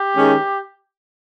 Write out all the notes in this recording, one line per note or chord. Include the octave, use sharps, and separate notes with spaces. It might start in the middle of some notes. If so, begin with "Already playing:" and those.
Already playing: G4
D#3 G#3 C#4